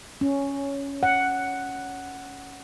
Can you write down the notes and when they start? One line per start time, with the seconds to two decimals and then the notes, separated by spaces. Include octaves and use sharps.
0.21 C#4
1.03 F#5